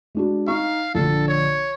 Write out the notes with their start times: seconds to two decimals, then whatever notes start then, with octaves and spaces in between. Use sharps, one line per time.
0.15 G#3 D4 F#4
0.47 D#4 F5 C#6
0.95 A#1 D3 A4
1.28 C#5